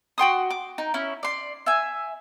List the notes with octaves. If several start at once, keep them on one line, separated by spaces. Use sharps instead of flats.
F#4 G5 C6 D#6
D6
D#4
C#4 E4
D5 C6
E5 G#5